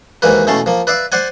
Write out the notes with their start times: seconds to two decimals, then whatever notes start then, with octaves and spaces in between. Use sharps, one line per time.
0.22 D#2 G#2 E3 A#3 B4
0.47 B2 E3 A3 C#4 F5 A5
0.66 F3 A#3
0.87 B4 D5 E5 F5 D6
1.12 C5 D5 F#5 G#5